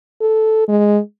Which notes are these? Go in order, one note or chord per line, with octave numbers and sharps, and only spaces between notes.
A4
G#3